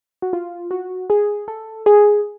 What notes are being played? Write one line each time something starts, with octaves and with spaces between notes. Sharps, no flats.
F#4
F4
F#4
G#4
A4
G#4